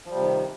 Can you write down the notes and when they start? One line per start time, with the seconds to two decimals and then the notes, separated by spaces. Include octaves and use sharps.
0.06 F3
0.10 G3
0.15 C3
0.20 D#3